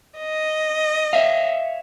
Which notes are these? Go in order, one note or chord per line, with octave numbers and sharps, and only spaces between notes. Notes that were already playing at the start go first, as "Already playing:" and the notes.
D#5
C#5 E5 F5